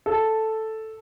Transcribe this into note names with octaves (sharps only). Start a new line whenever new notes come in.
A4